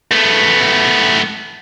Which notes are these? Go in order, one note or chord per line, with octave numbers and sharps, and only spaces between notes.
A3 B3